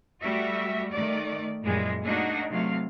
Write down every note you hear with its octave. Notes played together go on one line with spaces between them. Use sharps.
G3 A3 F#4 E5
D#3 A3 D5
F#2 A#2 E3 G3 G#3
A3 A#3 D4 D#4 F#4
C3 F#3 A3 F5